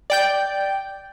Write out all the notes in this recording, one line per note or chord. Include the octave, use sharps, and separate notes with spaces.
D5 G5 G6